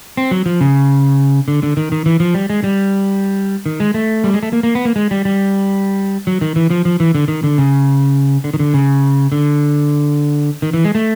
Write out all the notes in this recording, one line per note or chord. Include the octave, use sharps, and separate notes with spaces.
C4
F#3
F3
C#3
D3
D3
D#3
D#3
E3
F3
G3
G#3
G3
D#3
G#3
A3
G3
G#3
A3
A#3
A#3
B3
A#3
G#3
G3
G3
F#3
D#3
E3
F3
F3
E3
D3
D#3
D3
C#3
D3
D#3
D3
C#3
D3
D#3
E3
G#3
A3